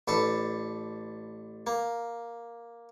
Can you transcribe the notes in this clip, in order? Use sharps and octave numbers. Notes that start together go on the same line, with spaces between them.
A1 D4 A4 B4
A#3